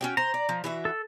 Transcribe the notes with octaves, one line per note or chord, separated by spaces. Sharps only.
C#4 F#4 G5
C5 A#5
D5
F3
E3 F#4 E5
A4